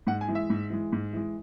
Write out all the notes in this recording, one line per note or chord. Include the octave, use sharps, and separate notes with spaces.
G#2 F#5
G#5
E3 G#3
E5
G#2
E3 G#3
G#2
E3 G#3